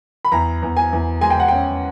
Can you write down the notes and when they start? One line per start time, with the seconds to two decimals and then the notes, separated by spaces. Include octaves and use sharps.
0.25 B5
0.32 E2 A#5
0.62 E2
0.77 G#5
0.93 E2
1.21 G#3 G#5
1.30 G5
1.40 F#5
1.48 C#4 G5